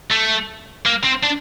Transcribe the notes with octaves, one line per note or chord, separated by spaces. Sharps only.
A3
A#3
C4
D4